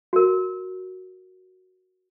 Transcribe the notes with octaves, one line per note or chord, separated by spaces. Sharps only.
F#4 A#4